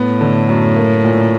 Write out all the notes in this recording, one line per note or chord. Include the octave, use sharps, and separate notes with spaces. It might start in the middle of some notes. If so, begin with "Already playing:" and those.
Already playing: A2 B3
D3
F#2
A#3
A#2